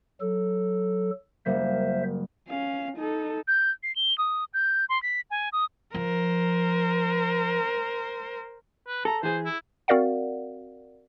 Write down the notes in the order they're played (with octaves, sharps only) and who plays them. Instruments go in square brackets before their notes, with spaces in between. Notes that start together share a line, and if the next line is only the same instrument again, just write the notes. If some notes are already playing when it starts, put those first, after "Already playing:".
[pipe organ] F#3 A4
[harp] F#1 G3 A#3 [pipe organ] C5 E5
[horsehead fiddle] C#4 F5
D#4 A4
[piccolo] G6
C7
G7
D#6
G6
C6
B6
G#5
D#6
[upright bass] F3 [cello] A#4 C5
[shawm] B4
[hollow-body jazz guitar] A4 [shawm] A#5
[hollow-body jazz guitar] E3 G#4 [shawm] C5
[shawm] E4
[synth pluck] C4 F#4 A#4 D5 F5 F#5